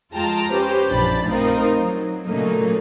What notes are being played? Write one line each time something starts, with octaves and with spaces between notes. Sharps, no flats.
F2 G#3 F4 G5 A5 A#5
C#4 G4 B4 C5
A#1 F#2 E3 D4 B5 A6
A3 C4 D#4 F4 A#4 C5
F#3
A#2 C#3 F#3 A3 A#3 D#4